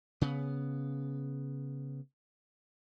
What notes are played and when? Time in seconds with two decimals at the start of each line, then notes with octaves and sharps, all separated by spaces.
0.21 C#3 B3